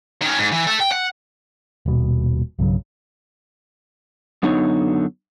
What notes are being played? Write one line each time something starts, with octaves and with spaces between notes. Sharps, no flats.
D#3 C#4
G#2
E3
A4 E5
G5
F#5
D#1 B2
B1 G2 C#3 F#3
F#2 D3 B3 D#4 C#5